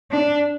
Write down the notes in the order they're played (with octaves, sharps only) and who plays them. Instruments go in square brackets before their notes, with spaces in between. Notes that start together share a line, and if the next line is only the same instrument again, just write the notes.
[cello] D4